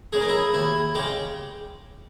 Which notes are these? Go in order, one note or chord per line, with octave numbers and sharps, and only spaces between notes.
C#3 G#3 G#4
A#4
E4 G#4
D#2 E4
C#3 G#3 G4